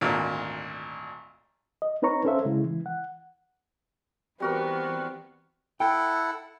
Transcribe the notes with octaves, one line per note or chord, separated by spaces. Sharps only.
G#1 D2 A#2
D#5
C4 D#4 B4 C#5 A#5 C#6
C#4 A4 C5 E5 F5
C#3 G#3 E4
E3
F#5
E3 G3 B3 C4 F#4 A#4
E4 A4 F#5 G5